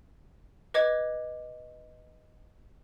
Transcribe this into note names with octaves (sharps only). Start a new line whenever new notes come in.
B4 D#5 D6 G#6